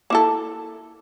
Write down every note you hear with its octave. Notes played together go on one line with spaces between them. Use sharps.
A#3 E4 A4